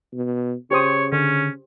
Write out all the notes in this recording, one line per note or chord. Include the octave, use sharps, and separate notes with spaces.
B2
C#3 G4 C5 C#5 D#6
D3 C#4